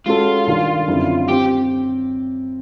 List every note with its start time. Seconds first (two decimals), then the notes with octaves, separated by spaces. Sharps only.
0.06 G#3 C#4 F4 F#4 A4
0.47 G2 D#3 G3
0.87 F#2 D3 G3 C4 E4
1.28 C4 F4 G4